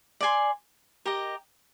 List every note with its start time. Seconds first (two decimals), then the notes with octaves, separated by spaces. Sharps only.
0.21 D5 G#5 C6
1.05 G4 A#4 D#5